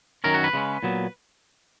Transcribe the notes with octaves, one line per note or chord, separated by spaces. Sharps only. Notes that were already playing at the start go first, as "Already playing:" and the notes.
F#2 D#3 F#3 C#4 A#4
F#4
B4
C#3 G#3 C#4
A#2 F#3 B3